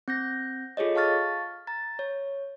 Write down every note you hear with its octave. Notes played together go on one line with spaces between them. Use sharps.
C4 G6 A#6
F4 G#4 A4 C#5 D#5
F5 A5 C#6 F6 A6
A#5 A6
C#5